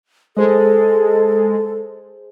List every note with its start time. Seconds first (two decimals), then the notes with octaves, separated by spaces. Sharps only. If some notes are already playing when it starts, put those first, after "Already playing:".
0.37 G#3 G#4 A4 C5 D#5